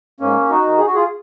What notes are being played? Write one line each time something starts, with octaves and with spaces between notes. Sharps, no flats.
G#2 A#3 C#4
D#4 F#4
D#3
G#4
F#4
F4 G#4